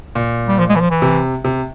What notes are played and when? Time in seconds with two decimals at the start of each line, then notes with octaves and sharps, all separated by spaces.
0.15 A#2
0.48 G3
0.59 F3
0.69 G#3
0.76 E3
0.81 F3
0.90 E3
1.02 C3
1.44 C3